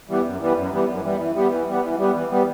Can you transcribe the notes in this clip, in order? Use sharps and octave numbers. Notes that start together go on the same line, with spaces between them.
E3 G3 B3
F#2
E3 G3 B3
F#2
E3 G3 B3
F#2
E3 G3 B3
E3
G3 B3
E3
G3 B3
E3
G3 B3
E3
G3 B3